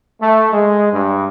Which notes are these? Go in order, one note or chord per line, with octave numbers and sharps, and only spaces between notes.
A3
G#3
G2